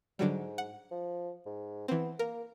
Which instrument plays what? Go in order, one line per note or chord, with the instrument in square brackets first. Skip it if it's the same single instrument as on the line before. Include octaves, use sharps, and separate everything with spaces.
[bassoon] G#2 [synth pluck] D3 F#3 G3
[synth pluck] F#5
[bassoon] F3
G#2
[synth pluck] E3 C4 [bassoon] B3
[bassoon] A#3 [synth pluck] A#4